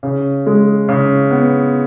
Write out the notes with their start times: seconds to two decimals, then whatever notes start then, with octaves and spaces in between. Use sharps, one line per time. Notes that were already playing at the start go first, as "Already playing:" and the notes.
0.03 C#3
0.46 G#3
0.89 C#3
1.31 B3